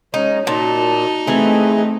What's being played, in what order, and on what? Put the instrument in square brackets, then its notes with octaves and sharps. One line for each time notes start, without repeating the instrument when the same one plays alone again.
[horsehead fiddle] G#3 [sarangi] C#4 [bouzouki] D#4
[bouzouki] A#2 [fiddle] D#4 [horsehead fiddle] F#4 [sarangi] A5
[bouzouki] E3 G#4 [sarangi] A3 [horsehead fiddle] C4 D#5